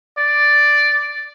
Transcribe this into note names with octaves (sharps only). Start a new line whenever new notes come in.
D5